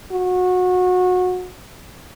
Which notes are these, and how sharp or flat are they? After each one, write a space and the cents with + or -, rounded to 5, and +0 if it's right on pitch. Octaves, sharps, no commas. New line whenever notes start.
F#4 -25